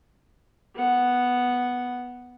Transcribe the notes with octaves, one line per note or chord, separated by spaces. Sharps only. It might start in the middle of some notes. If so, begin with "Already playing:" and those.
B3 F#5